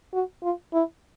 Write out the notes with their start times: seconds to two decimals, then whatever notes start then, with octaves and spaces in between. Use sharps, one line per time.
0.13 F#4
0.43 F4
0.73 E4